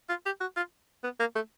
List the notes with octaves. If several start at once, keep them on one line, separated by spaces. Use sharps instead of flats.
F4
G4
F#4
F4
B3
A#3
A3